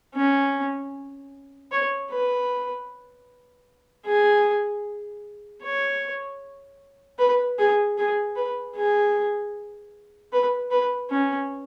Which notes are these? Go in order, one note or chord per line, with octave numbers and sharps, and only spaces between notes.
C#4
C#5
B4
G#4
C#5
B4
G#4
G#4
B4
G#4
B4
B4
C#4